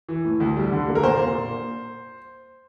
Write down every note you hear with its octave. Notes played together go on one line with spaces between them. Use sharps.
E3
A2
D2
G3
D3
A#3
A#4
A#2 C5
A#2